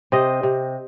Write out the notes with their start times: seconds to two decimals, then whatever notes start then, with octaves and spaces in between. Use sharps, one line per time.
0.12 C3 C5 D#5
0.43 C3